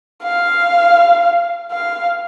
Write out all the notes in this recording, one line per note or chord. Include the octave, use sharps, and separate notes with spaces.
F5
F5